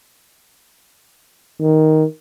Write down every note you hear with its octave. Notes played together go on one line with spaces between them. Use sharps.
D#3